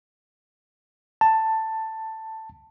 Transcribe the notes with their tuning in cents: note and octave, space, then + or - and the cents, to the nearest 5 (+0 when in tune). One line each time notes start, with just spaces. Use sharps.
A5 +10